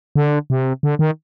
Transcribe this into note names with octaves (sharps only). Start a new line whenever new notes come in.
D3
C3
D3
D#3